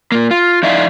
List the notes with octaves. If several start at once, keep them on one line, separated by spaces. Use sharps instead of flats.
A#2 A#3
F4
F3 D#4 E4 D5 E5 F5